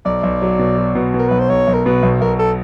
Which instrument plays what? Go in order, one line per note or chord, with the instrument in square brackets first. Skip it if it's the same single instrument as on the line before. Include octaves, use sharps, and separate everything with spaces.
[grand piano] B1 [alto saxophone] D5
[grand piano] B1
F#3
B2
F#3
B2
B2
[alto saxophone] A#4
[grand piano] B1 [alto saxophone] B4
[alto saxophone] C5
[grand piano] B1 [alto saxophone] C#5
[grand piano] B1
[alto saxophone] A#4
[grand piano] B2 [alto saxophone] B4
[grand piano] B1
[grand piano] B1 [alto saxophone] A#4
[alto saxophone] A4